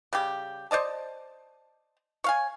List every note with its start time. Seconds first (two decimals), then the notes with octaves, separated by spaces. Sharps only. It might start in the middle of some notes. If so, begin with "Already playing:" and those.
0.13 C#3 G3 G4
0.71 C5 D5 D#5 A5
2.24 C#5 F5 G#5